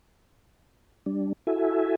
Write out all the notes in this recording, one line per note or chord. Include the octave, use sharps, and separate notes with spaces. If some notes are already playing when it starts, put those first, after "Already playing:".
G3 D4
E4 F#4 A4 E5 G#5